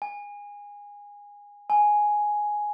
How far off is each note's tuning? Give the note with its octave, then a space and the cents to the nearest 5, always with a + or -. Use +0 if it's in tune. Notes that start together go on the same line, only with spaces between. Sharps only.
G#5 -20
G#5 +5